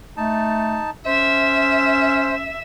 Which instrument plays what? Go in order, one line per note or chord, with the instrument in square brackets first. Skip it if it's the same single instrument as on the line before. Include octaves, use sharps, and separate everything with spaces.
[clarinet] A3 [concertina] D#4 A5
[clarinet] C#4 [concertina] C5 [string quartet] E5